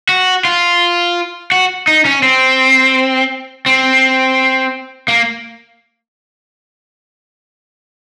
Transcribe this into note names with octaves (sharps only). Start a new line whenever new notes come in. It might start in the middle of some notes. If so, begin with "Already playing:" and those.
F#4
F4
F#4
D#4
C#4
C4
C4
A#3